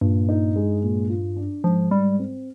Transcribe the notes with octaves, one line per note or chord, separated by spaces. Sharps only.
G2 A#2
D#4
G#3
A#2
F4
D4
G#2 F3
G#2 G3
C4